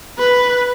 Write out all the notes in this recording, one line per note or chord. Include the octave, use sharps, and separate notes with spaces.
B4